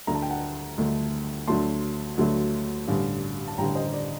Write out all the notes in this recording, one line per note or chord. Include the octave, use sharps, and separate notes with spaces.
D2 D3 A3 A#5
A5
G5
F#5 A5
D2 D3 A3
D2 D3 F#3 A3 A5 C6
D2 D3 F#3 A3
A1 G2 D3
A5
A1 G2 D3 G5 A#5
C5 D#5
D5